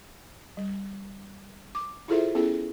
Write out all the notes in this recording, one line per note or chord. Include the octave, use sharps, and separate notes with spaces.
G3
D6
E4 F4 G#4 A4 C5 E5
B3 C#4 E4 G#4 A4